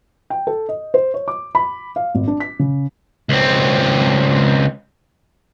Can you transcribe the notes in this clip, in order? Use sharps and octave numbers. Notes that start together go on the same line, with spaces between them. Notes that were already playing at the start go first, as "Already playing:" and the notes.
G5
A4
D#5
C5
C#5
D6
B5
F5
G#1
D4
B6
C#3
C#2 C4